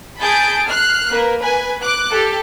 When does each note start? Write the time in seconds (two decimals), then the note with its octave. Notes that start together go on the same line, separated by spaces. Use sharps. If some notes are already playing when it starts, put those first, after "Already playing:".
0.19 G#4 A5 B5 G6 D7
0.68 F6 F#6 C7
1.10 A#3 A#4 B4
1.40 B4 G#5
1.82 D6 F#6
2.11 G4 A4